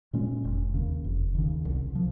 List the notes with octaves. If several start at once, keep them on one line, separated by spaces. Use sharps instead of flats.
A#2 G#3 C#4
F1
D#2 C#3
F1
D#2 C#3
C2
F3